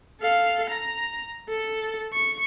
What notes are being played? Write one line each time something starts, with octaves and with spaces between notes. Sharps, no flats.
A4 F5
A#5
A4
C#6